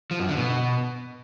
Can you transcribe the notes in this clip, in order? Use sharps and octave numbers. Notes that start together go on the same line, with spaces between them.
F3
F#2
D3
B2